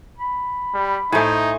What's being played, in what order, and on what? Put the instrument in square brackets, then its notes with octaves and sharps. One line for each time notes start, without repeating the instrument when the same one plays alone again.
[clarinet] B5
[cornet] G3
[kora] A2 A3 [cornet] D#4 [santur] C5 G#5